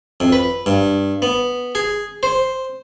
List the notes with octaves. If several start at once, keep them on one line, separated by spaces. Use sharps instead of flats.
F2
B4
G2
B3
G#4
C5